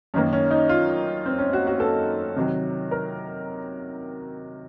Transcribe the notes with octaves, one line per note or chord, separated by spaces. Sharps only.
F#2 D#3 A#3 C#4
C#4
D#4
F4
C4
C#4
F#4
F#4
A4
C3 D#3 F#3
A#4